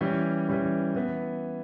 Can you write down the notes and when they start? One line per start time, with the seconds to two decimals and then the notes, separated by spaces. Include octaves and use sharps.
0.01 E3 G3 C#4
0.48 E3 G3 C#4
0.95 E3 B3